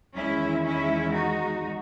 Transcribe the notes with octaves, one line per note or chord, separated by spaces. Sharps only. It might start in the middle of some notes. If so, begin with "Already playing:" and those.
E2 D#3 G#3 C#4 E4
C#4 E4
D#4 F#4